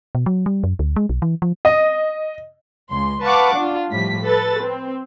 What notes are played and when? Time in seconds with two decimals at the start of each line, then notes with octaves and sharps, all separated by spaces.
0.15 B2
0.26 F#3
0.46 G3
0.64 F#2
0.79 D2
0.96 G#3
1.09 B1
1.22 E3
1.42 F3
1.65 D#5
2.90 C#2 C6
3.22 B4 F5 F#5 A5 C#6 D6
3.54 D4 F4
3.92 A2 F3 G3 B6
4.24 A4 B4 A6
4.63 C4